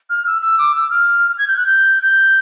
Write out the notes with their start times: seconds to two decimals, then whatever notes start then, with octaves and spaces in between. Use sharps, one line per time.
0.10 F6
0.27 E6
0.42 E6
0.58 D6
0.75 E6
0.90 F6
1.38 G#6
1.48 G6
1.57 F#6
1.66 G6
2.03 G6